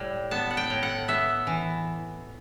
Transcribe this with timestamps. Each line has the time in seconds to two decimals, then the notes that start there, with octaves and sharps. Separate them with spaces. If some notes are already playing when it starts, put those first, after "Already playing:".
Already playing: A2 G3
0.31 B3 A5
0.51 F#5
0.57 G5
0.70 A2
0.83 F#5
1.08 B3 E5
1.47 E3